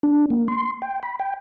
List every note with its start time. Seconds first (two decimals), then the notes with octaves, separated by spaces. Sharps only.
0.03 D4
0.30 A#3
0.48 C6
0.82 G5
1.03 B5
1.20 G5